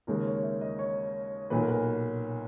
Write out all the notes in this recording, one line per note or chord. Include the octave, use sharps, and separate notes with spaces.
D#2 C#3 G#3 A#4
C#5
E5
D#5
C#5
B1 A#2 F#3 B4
A#4
B4